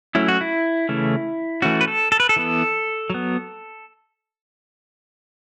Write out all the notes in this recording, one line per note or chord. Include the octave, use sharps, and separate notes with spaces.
F#3 A3 C#4 E4
F#4
E4
C#3 E3 A3 C#4
E3 A3 C#4 F#4
B4
A4
A4
B4
A4
E3 B3
F#3 B3